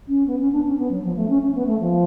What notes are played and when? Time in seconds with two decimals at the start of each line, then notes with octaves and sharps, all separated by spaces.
0.08 C#4
0.27 B3
0.39 C#4
0.52 D4
0.65 C#4
0.78 B3
0.91 F#3
1.04 F3
1.16 A3
1.29 C#4
1.42 C#4
1.55 B3
1.67 A3
1.80 F3